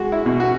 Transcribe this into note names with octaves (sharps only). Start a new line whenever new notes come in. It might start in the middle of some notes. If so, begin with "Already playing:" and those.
Already playing: G#3 F#4
E4
B2
F#4